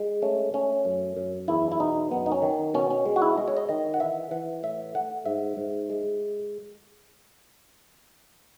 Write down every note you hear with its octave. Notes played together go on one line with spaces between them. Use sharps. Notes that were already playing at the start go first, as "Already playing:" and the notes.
Already playing: G#3
A3 C#4
A3 C#4
F#2
F#2
E2 E4
E4
B2 D#4
F#2 B3
D#4
C#4
D#3
B2 C#4
C#4
G#3
F#4
E4
G#3 D#5
C#5
D#5
D#3 D#5
F#5
E3 E5
E3 F#5
A2 E5
A3 F#5
G#2 E5
G#2
G#3